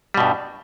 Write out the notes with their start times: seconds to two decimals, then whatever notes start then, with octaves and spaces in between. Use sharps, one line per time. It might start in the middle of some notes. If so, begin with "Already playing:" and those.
0.14 G3
0.17 B2
0.20 G2